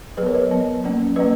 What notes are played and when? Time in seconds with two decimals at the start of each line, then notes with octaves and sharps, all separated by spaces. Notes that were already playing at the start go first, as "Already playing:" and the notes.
0.17 F#3 G#4 B4
0.22 B3 A#4 C#5
0.34 B4 D#5
0.51 F#3 B3
0.84 F#3 A#3 C#4
1.16 F#3 A#3 C#4 B4 D#5